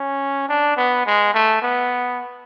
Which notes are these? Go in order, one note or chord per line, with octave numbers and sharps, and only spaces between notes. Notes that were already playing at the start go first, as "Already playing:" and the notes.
Already playing: C#4
D4
B3
G#3
A3
B3